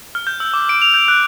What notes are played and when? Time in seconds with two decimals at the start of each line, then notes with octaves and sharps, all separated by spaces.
0.15 F6
0.27 G6
0.40 E6
0.54 D6
0.69 D7
0.82 F7
0.94 G6
1.08 F#6